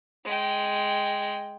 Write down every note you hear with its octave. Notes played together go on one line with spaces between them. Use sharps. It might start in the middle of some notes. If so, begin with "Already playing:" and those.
G#3 G5